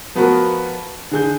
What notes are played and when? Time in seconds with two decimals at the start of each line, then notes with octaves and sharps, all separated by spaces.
0.15 F3 B3 F#4 A#4 B4
1.11 D3 G#4 G6